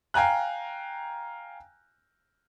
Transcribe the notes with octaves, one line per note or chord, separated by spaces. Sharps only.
F5 G5 G#5 A#5 F#6